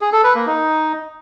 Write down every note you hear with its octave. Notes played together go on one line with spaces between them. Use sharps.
G#4
A4
B4
A#3
D#4